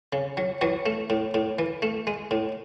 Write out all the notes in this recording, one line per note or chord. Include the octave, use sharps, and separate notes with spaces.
C#3
F#3
E3 F#3 F#4
A3
A2
A2
E3
A3
G#3
A2